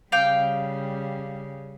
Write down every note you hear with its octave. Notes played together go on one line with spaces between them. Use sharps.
C#3 G3 F5 G5 D6